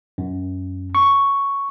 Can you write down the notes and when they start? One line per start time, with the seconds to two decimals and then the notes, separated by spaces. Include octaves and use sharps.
0.18 F#2
0.95 C#6